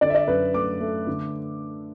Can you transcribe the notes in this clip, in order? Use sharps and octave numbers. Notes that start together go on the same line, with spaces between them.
D3 D5
E5
D5
F#2 B4
A3 D6
A3
D3